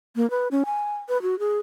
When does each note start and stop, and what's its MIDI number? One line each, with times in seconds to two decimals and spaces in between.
0.16 0.29 58
0.30 0.48 71
0.51 0.63 61
0.65 0.96 80
1.09 1.20 71
1.22 1.38 66
1.39 1.58 68